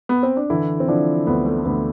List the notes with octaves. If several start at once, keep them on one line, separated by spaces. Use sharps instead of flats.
B3
C4
D4
D3 E3 E4
C4
D3 F3 D4
D2 B3
A3
D2 B3